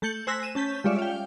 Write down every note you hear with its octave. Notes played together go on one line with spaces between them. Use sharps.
A3 A5 G6 C#7 F#7
C5 G#5 E6 F#6 A#6 B6
D#7 E7
C#4 A5 G6 B6
G3 G#3 F4 C#5 D5 E5
F5 G5